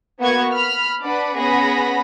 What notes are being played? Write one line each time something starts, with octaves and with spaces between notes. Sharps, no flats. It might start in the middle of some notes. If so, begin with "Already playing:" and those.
A#3 B3 F#4 F#5 C#6 G#6
B5 F6
D4 B4 D5 F#5 B5
B3 C#4 G#4 F#5 B5 A#6